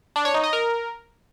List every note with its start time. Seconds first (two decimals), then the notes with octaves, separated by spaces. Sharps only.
0.16 D4
0.25 C#5
0.34 D#4
0.44 D#5
0.53 A#4